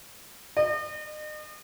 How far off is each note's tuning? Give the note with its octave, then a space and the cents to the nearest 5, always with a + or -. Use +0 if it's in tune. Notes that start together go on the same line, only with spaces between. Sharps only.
D#5 -40